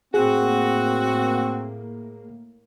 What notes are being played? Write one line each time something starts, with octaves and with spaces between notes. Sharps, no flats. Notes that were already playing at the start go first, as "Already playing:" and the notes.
A2 A#3 C4 F#4 G#4